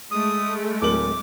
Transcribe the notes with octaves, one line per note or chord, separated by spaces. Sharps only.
G#3 A3 D#6
D1 A#4 D6 F#7